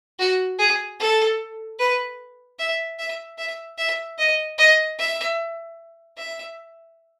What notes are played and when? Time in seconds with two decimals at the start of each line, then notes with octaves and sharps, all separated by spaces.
0.19 F#4
0.59 G#4
1.00 A4
1.79 B4
2.59 E5
2.99 E5
3.38 E5
3.78 E5
4.18 D#5
4.58 D#5
4.99 E5
6.17 E5